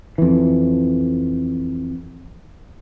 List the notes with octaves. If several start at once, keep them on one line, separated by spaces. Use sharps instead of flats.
F2 E3